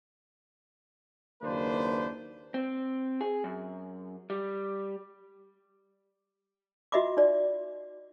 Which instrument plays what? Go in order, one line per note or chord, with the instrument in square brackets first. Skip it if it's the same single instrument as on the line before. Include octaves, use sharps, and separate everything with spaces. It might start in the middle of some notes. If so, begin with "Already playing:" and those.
[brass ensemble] F#1 D#2 A#3 D4 B4 C5
[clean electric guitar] C4
G#4
F#2
G3
[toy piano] F4 F#4 D#5 E5 B5 D6
D#4 D5